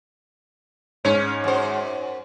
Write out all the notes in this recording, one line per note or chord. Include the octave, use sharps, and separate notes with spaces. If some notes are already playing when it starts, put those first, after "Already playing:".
G#2 C#4 C#5
F#2 C5